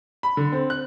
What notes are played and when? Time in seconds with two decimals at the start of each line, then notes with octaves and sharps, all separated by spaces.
0.23 B5
0.37 D3
0.52 C4
0.70 F#6